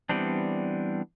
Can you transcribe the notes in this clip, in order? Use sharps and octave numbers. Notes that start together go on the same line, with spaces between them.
E3 G3 B3 C4 D4